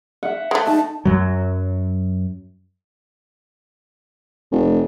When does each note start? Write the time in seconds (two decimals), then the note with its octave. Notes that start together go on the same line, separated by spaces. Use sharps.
0.23 E5 F#5
0.51 G#3 A3
0.67 D#4 A5
1.05 F#2 F#3
4.51 F1